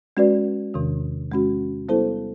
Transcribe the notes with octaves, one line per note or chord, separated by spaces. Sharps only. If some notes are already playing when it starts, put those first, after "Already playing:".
G#3 C#4 F#4 B4 D5
E2 C3 D#3
G#3 C#4 F#4
G3 B3 E4 A4 C5